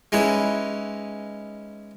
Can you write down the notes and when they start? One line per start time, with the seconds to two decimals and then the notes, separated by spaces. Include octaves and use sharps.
0.12 G#3 C#4 D#4 E4 B4 C#5